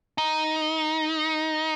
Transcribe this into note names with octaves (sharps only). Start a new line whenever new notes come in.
D#4